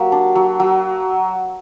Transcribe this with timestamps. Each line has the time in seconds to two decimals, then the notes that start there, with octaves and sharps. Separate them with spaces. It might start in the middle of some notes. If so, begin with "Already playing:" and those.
Already playing: F#3 A#3 G4
0.12 D4
0.35 F#3
0.60 F#3